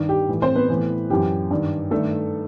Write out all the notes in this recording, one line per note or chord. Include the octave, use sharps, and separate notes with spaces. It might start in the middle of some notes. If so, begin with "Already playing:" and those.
Already playing: G2 D#3
G4
A2 E3
C4 C5
B3 B4
A2 E3
F#2 E3 G4
G2 D#3
G2 D#3 A3 A4